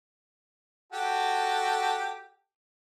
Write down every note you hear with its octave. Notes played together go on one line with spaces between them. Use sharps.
F#4 G4 A4